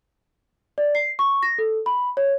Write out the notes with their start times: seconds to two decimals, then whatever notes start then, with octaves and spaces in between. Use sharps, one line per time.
0.78 D5
0.95 C7
1.19 C#6
1.43 A#6
1.58 A4
1.86 B5
2.17 C#5